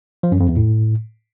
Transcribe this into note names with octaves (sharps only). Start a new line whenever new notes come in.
F3
F#2
F2
E2
A2